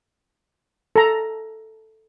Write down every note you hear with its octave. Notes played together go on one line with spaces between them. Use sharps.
A4 A#5